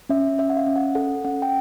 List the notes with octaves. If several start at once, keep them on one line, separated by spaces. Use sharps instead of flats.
C#4 E5
C#4 E5
F#5
F5
C#4
F#5
A4 F#5
C#4 F#5
G5